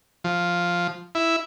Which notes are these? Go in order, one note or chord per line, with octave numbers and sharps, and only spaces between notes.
F3
E4